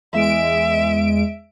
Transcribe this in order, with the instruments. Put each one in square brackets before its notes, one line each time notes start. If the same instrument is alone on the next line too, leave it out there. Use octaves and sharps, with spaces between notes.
[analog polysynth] E2 G#3 D7 [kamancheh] E5